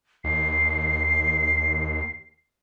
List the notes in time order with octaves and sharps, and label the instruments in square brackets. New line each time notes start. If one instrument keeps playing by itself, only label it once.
[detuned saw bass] D#2 [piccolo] C7